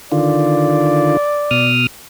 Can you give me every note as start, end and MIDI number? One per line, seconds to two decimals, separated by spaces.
0.12 1.17 50
0.12 1.17 51
0.12 1.17 65
0.12 1.72 74
1.51 1.87 47
1.51 1.87 87
1.51 1.87 89